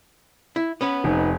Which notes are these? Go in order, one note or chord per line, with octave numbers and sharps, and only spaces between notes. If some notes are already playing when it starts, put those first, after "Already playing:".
E4
B3 C#4 B4
F1 D#4